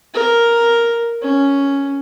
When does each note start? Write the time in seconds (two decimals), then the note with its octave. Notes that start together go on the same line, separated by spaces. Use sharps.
0.14 A#4
1.23 C#4